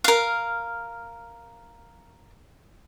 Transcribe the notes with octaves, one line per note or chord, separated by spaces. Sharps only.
A#4 F5